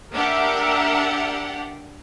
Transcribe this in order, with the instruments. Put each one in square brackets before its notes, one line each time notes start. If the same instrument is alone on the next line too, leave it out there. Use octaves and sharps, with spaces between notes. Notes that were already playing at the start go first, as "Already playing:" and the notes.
[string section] D4 G4 F#5 [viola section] A#4 E5